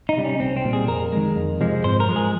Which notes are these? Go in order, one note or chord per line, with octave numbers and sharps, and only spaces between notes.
D#4
C3 G3
C#4
C2 C4
C4
A#2 G3
G#4
F2 A#4
D#3 G#3
F2
C3 F3 G#3
G#2 C5
A#4
F3 G#3
G#4